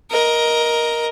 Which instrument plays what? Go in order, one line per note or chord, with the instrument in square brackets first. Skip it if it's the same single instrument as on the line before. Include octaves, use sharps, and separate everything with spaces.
[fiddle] A#4 D#5